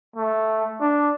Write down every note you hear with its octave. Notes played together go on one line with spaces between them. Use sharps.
A3
D4